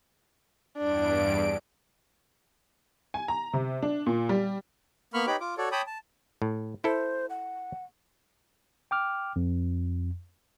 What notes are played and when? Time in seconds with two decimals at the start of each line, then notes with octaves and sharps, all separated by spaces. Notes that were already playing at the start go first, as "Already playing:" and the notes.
0.78 E2 G2 D4 D7
3.14 G#5
3.28 A#5
3.53 C3
3.83 D4
4.06 A#2
4.29 G3
5.14 A#3 B3 B5 C#6 F6
5.27 D#4 G4 B4 C#5 B5 D6
5.40 F4 D6
5.58 F#4 A4 C#5 D5
5.72 C#5 G5 A5 B5 D6 D#6
5.87 A5
6.42 A2
6.84 E4 A4 C5
7.30 F#5
8.91 G5 D6 F6
9.36 F2